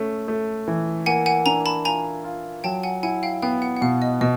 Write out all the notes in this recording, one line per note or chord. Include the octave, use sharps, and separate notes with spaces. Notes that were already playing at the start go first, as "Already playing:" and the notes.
Already playing: A3 C#4
A3
E3
A#3 F#5 G#5
F#5 G#5
D4 G#5 A#5
A5 B5
F4 G#5 A#5
F4
F#3 G5 A5
F#5 G#5
E4 F#5 G#5
F5 G5
B3 F5 G5
F#5
F#5
B2 F5
D#5
B2 D#5